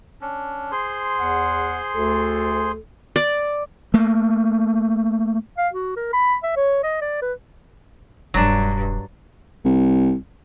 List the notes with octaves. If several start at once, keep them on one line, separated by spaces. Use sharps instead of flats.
C#4 D4
G#4 C5 C6
E2 F#5
D2 A4
D5
A3 A#3
F5
F#4
A#4
B5
E5
C#5
D#5
D5
B4
E1 G2 F#3 D4
C2